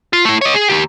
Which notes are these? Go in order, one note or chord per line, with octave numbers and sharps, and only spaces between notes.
F4
A3 E4
C#5 D#5
G#4
D#2 G4